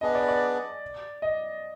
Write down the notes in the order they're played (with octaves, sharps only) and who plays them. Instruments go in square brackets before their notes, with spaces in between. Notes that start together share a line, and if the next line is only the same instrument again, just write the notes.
[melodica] B3 D4 G#4 B4 [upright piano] D#5
[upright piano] D5
D5
D#5